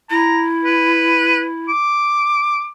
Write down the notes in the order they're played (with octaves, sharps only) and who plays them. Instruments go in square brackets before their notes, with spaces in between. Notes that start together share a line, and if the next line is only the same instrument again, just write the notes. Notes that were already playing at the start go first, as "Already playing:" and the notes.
[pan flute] E4 [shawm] A#5
[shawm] B4
D6